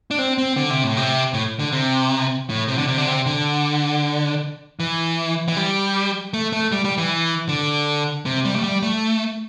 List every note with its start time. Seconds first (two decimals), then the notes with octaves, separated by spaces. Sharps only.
0.11 D4
0.19 C4
0.38 C4
0.57 D3
0.70 C3
0.84 A2
0.97 C3
1.34 A2
1.59 D3
1.72 C3
2.49 A2
2.68 C3
2.78 D3
2.88 C3
2.98 D3
3.07 C3
3.26 D3
4.80 E3
5.48 E3
5.57 G3
6.33 A3
6.53 A3
6.72 G3
6.85 G3
6.98 E3
7.49 D3
8.26 C3
8.45 G3
8.56 A3
8.64 G3
8.83 A3